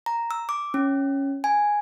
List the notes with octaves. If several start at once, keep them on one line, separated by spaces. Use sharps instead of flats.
A#5
E6
D6
C#4
G#5